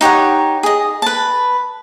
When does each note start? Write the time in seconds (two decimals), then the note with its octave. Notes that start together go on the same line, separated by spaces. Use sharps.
0.01 D#4 G4 C#5 F#5
0.63 G#4 D#5
1.02 B4 A5